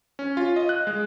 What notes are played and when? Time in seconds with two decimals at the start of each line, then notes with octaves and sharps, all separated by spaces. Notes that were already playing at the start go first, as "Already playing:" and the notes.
0.19 C#4
0.37 F4
0.56 D#5
0.69 F#6
0.87 G#3